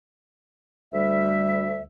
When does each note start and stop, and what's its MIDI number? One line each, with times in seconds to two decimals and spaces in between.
0.93 1.82 38
0.93 1.82 55
0.93 1.82 76